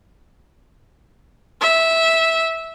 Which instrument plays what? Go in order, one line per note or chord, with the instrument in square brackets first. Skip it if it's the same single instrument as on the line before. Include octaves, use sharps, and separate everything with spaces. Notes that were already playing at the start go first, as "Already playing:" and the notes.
[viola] E5